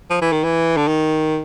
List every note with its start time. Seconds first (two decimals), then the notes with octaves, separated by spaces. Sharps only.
0.10 F3
0.21 E3
0.32 D#3
0.44 E3
0.77 D3
0.88 D#3